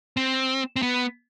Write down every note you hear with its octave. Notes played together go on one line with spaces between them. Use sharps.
C4
C4
B3